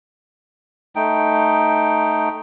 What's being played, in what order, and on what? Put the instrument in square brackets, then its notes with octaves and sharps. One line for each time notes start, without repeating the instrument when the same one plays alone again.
[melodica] A3 D#4 G5